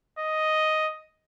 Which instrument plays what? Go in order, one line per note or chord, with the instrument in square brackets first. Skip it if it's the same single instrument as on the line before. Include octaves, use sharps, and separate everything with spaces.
[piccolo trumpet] D#5